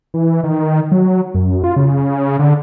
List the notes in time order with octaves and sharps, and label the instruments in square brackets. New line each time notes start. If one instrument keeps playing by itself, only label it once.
[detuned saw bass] E3
D#3
F#3
F#2
F4
C#3
D3